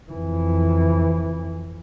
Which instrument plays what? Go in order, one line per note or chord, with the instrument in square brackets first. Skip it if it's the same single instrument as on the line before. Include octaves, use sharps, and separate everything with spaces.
[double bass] F2 E3